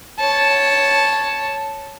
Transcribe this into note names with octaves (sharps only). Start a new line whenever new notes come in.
C#5 A5